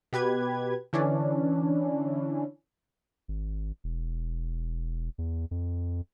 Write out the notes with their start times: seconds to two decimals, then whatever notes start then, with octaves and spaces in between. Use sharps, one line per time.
0.13 B2 G4 B4 G#6
0.93 D3 E3 C#4 D4
3.28 G#1
3.84 E1
5.18 E2
5.51 F2